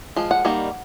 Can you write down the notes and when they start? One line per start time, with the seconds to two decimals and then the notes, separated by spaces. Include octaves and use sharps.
0.16 F3 G#3
0.31 F#5
0.45 D#3 G3 A#3 D#4